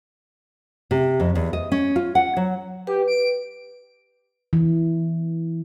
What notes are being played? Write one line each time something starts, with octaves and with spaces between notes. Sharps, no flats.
C3
F2
E2
D#5
C#4
F4
F#5
F#3
G4 B4
D7
E3